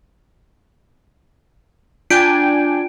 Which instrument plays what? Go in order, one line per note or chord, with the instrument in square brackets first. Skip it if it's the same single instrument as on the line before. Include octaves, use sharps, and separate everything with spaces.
[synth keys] D4 G5 G#5 [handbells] F4 G6 [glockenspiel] D7